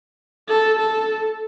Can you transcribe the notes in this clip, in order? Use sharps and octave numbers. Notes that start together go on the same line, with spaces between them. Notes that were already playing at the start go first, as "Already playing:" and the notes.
A4
A4